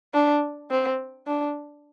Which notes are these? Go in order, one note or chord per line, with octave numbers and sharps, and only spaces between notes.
D4
C4
D4